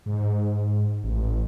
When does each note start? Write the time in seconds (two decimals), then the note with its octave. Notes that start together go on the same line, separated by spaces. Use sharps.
0.06 G#2
1.04 A1